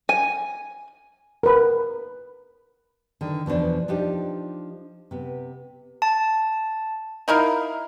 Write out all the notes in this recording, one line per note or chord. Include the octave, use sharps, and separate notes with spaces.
G#5
A#4 B4
D3 D#3
E2 B2 F3 D4
F3 D4 D#4 G4
C3 B3
A5
D#4 E4 A#4 F5